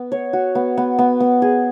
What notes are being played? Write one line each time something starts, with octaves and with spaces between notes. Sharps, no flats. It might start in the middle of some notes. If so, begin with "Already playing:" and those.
Already playing: B3
C#5
F#4
B3
B3
B3
B3
G#4